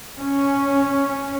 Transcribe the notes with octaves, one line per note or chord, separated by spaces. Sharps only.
C#4